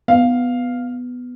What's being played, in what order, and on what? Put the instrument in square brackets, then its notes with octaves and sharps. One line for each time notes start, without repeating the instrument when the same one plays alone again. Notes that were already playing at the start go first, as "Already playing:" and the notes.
[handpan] B3 [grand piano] F5